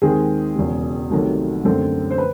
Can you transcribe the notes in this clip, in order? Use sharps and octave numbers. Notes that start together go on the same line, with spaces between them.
D#2 D#3 G#3 C4 G#4
E1 E2 C#3
C2 C3 D#3 F#3 A3
F#2 D3 F#3 A3 C4
C5
B4